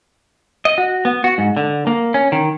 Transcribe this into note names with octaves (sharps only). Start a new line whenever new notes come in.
D#5
F#4
B3
F#4
G#2
D3
A#3
C#4
D#3